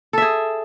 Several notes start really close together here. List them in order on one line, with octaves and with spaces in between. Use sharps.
A4 E5 G#4